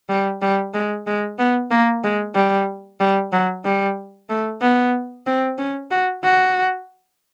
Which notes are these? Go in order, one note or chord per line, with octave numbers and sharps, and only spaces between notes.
G3
G3
G#3
G#3
B3
A#3
G#3
G3
G3
F#3
G3
A3
B3
C4
C#4
F#4
F#4